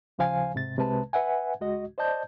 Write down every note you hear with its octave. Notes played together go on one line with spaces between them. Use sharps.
D#2 C#3 F3 C5 F5 G#5
G#2 C3 A6
C2 C3 G#3 B4 A5
B4 E5 F#5 G#5
C#2 G#3 F#4 D#5
C5 D5 D#5 A5 G6